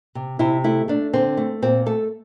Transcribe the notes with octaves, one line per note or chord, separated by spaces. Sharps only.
C3
C3 E4
A3 E4
A3 D4
D3 C4
A3
A#2 C4
A3 A4